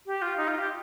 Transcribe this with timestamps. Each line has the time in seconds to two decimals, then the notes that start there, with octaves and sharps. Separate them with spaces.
0.06 G4
0.22 F4
0.37 D#4
0.48 F4
0.59 G4